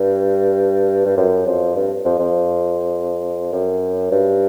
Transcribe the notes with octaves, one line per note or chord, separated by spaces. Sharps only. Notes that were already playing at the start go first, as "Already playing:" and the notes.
Already playing: G2
G2
F#2
F2
G2
F2
F2
F#2
G2